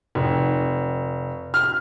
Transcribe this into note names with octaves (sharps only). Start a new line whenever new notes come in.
F1
F6